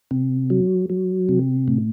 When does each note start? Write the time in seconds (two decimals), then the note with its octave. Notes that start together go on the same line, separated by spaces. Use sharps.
0.11 C3
0.50 F#3
0.90 F#3
1.29 C3
1.68 A2